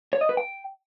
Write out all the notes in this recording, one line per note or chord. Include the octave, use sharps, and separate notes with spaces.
C#5
D#5
B4
G5